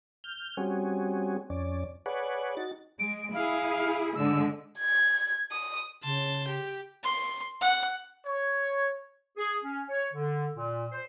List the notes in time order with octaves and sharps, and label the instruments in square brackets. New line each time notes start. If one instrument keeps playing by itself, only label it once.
[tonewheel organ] F6 G6
G3 C4 C#4 F#4 G#4
F2 C#4 D5
G#4 B4 C#5 D5 F#5
D#4 F#4 A6
[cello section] G#3 [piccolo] D7
[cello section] E4 G#4 [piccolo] F5
[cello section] G#2 D3 G#3 [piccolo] E6
[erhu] G#6
D#6
[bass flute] C#3 [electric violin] A5 C6
[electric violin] G4
[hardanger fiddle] C6
F#5
[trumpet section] C#5
[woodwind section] G#4
C#4
C#5
D3
A#2
C5